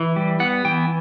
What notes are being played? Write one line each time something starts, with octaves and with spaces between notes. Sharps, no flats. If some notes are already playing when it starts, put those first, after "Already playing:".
Already playing: E3
G3
B3 F#5
E3 G5